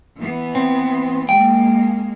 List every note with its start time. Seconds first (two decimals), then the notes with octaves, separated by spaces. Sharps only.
0.18 E3 B3
0.55 C4
1.29 G#3 A#3 G5